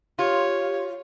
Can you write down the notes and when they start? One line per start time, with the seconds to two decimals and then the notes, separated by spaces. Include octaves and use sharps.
0.19 F4 G4 C#5